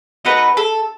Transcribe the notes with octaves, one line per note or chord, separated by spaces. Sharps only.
A3 D#4 F#4 B4
A4